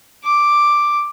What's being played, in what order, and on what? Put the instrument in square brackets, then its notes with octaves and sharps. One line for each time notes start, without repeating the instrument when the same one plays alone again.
[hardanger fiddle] D6